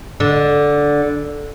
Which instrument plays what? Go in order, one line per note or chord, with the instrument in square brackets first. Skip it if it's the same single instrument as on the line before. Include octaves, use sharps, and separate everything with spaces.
[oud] D3